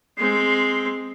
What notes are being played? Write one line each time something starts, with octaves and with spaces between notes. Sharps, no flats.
G#3 C4 C7